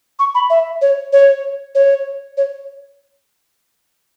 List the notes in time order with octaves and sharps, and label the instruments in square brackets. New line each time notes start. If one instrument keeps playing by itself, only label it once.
[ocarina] C#6
B5
E5
C#5
C#5
C#5
C#5